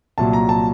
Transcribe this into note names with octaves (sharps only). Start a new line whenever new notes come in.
C2 A#2 F#3 A5
A#5
A5